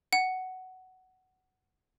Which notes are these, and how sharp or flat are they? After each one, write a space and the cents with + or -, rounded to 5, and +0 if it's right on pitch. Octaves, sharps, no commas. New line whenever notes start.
F#5 +10